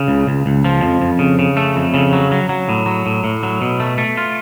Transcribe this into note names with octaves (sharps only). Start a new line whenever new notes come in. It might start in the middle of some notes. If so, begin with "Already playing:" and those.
Already playing: C#3
C#2
C#2
C#2
F3
F2
F2
C#3
C#3
A3
F2
C#3
F#3
F#3
F#3
A2
F#3
A2
A2
F#3
B2
A3
A3
F4